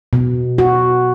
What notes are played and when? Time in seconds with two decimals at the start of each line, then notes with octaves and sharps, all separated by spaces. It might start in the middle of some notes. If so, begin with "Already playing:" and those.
0.13 B2
0.58 F#4